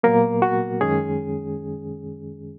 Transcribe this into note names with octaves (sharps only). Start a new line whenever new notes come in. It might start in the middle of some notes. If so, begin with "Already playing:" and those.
A#2 F#3 A#3 B3 A#4
F#4
F#2 D#3 G#3 C#4 G#4